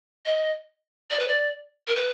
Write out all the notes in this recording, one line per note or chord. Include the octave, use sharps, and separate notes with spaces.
D#5
D5
B4
D5
A#4
B4